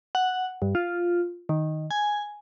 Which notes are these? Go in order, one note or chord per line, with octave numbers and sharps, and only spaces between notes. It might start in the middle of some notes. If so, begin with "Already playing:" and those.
F#5
G2
F4
D#3
G#5